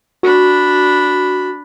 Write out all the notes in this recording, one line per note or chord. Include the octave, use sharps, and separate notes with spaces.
D4 F#4 B5